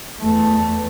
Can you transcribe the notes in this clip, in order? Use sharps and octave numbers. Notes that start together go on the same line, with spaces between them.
E2 A3